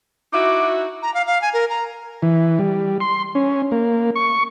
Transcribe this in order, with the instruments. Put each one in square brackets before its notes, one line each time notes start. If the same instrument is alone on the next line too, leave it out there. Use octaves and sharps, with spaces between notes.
[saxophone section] D#4 E4 F#4 [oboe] D6
[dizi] A#5
F5
F5
G#5
A#4
A#5
[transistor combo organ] E3
G3
C6
C#4
A#3
C#6